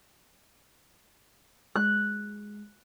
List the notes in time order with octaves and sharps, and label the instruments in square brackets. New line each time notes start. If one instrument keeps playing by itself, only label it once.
[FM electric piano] G#3 [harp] F#6